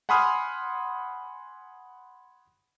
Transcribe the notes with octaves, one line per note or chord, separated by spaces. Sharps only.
F#5 G#5 B5 C6 D#6 F6